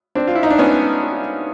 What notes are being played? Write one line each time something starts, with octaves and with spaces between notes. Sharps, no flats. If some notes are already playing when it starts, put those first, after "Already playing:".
C4 D4
F4
E4
D#4
D4
B3 C#4